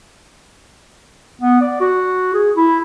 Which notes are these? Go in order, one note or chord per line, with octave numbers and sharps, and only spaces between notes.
B3
D5
F#4
G#4
E4